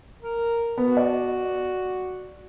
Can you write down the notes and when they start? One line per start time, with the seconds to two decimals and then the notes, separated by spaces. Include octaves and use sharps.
0.22 A#4
0.78 B3 F#4
0.97 D5